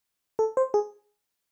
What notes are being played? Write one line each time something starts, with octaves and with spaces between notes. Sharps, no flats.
A4
C5
G#4